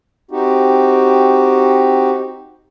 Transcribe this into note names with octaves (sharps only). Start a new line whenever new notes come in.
C4 D#4 F#4 G4